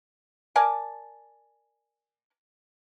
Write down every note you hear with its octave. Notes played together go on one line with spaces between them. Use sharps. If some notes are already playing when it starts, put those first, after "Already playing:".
A#4 D5 G#5 A5